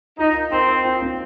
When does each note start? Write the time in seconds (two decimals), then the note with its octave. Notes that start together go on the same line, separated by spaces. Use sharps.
0.19 D#4 F4
0.35 A#4
0.51 C4 A#4
0.69 A#4
0.85 F4
1.02 C4